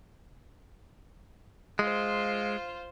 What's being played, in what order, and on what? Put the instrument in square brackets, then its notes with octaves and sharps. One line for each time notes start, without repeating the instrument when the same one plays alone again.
[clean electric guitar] G#3 [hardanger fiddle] F4 C5